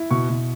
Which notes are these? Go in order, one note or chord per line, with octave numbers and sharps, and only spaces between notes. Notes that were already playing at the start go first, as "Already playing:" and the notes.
Already playing: E4
B2 C#6
B2